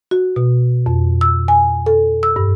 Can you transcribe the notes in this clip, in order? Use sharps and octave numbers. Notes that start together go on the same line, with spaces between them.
F#4
B2
F2
E6
G#5
A4
E6
G2